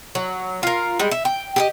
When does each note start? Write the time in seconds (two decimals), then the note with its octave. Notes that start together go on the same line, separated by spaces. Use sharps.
0.15 F#3
0.63 F4 A#4
0.99 G3 G#3
1.11 E5
1.25 G5
1.56 G4 G#4 D#5